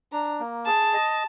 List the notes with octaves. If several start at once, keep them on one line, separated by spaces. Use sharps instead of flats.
D4 A#5
A#3
G#4 A5
D#5